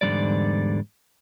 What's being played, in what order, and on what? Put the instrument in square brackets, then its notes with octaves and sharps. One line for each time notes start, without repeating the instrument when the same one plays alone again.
[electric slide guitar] E2 G#2 D3 F3 G3 D5